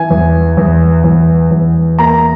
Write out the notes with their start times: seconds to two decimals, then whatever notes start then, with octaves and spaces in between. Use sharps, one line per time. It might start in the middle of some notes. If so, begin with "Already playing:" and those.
Already playing: E3 G#5
0.10 E2
0.57 E2
1.04 E2
1.51 E2
1.98 A#3 A#5